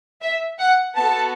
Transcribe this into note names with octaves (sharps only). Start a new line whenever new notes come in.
E5
F#5
B3 F#4 A4 A5